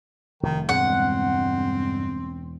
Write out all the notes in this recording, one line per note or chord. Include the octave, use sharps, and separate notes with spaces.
F1 D#3
E1 G2 C#3 G#3 C4 F#5